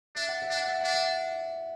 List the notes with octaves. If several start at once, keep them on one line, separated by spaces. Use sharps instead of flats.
D4 E5
F#5
E5
D4
F#5
E5
D4 F#5
E5